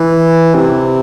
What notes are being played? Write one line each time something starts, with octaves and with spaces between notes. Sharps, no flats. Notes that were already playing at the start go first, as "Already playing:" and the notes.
Already playing: E3
C3